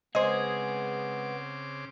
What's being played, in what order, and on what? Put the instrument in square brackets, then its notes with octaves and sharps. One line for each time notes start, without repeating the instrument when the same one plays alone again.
[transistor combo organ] C#3 C4 D6 [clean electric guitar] G#3 G#4 [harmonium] B3 [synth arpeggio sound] C5 D#5